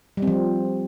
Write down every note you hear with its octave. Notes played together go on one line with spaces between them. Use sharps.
G3
C4
F3